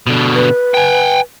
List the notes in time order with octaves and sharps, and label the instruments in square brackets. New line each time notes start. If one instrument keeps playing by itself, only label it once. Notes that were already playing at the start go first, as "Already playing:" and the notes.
[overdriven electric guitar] B2 D3
[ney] B4
[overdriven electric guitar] G5 G#5